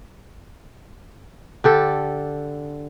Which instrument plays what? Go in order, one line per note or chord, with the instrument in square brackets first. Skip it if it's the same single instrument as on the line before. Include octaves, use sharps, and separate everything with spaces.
[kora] D3 G4 A4